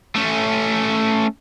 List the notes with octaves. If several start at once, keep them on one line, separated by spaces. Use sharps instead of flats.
A3 C#4